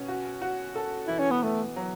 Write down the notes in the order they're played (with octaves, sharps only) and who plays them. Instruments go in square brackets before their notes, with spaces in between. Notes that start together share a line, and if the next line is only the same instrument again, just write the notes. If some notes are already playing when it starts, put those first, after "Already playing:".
Already playing: [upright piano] B2 C#4
F#4
F#4
A4
[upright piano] E3 [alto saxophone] E4
[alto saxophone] C#4
B3
[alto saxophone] A3 [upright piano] B3
[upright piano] F#3